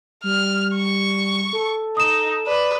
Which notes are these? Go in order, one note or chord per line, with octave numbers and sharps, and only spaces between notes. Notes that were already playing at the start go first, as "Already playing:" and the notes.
G3 F6
C#6
A4
D#4 D#6 E7
B4 D5